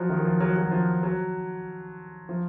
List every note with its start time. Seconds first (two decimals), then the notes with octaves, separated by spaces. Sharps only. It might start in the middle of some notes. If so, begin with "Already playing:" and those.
Already playing: F3 F#3
0.10 D#3
0.18 F#3
0.25 F3
0.40 F#3
0.56 F#3
0.71 F3
1.03 F#3
2.29 F3